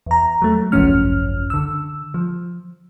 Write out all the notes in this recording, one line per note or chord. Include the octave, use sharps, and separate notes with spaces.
E2 A#5
F#3 A3
G#1 C#2 F#2 F3 C#4 F6
D3 E6
F3